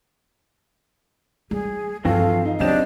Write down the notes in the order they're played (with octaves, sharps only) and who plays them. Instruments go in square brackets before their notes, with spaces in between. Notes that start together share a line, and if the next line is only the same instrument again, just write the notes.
[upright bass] G3 [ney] G#4
[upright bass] G2 [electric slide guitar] E3 C4 F#4 [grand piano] F3 A4 [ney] F5
[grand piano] D#4
[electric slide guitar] C#3 G4 [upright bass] F#3 [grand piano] C4 D#5 E7 [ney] D4